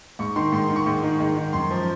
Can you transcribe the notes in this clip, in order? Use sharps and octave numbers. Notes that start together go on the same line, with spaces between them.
G#2 C#6
D#3 C6
G#2 C6
D#3
C#6
G#2 C#6
D#3
G#2
D#3
F#2 C6
F3